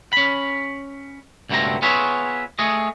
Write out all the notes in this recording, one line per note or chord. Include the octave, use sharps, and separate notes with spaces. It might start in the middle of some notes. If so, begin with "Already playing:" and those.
C#4 B5
C#2 G2 B2 A3 C4 A#5
B3 F4 G#4 B4 C#5 E5
A3 G#4 D#5